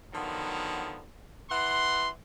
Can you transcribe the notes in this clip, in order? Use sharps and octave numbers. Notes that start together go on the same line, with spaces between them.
D3 D#3 F3 F#3 B3
E3 F#5 C6